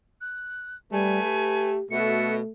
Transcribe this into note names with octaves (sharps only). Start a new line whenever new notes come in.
F#6
G3 A3 B4 G#5
G4
B2 A3 F#4 A4 E5 C#7